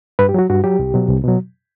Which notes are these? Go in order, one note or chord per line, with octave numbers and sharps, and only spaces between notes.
G2 B4
G4
F#3 F#4
G2 F#4
F#3 G4
C2
B2 F#3
C2
B2 F#3